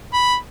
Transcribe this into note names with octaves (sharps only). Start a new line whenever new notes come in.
B5